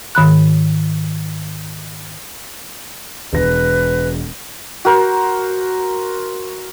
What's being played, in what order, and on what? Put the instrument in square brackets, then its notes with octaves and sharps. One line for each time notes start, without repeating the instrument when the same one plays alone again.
[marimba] G#2 D#3 B5 F#6
[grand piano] E1 A#6 [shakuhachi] B4
[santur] F#4 A#4 C5